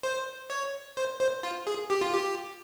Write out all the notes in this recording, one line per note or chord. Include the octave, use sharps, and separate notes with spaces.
C5
C#5
C5
C5
F4
G#4
G4
F4
G4